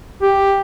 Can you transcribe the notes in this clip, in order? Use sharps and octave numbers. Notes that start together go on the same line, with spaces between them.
G4